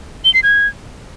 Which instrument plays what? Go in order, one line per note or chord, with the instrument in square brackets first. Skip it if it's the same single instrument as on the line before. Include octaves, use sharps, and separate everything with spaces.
[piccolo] G7
C7
G#6